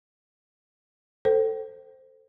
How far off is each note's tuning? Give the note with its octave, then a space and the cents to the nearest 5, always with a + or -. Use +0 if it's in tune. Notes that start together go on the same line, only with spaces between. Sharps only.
A4 +15 C5 +0 G5 -30